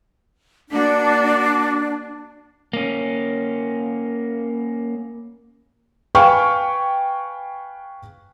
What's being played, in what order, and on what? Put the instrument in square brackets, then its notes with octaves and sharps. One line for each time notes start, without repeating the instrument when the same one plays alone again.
[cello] A#3 F#4 [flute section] D4
[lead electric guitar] A#3 C#4
[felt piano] B4 F5 G5 G#5 C#6 F6